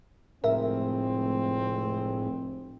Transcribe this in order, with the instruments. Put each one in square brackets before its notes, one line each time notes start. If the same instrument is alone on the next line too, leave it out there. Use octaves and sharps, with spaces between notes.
[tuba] F1 [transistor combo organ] A2 G#3 [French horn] C4 [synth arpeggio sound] A#4 E5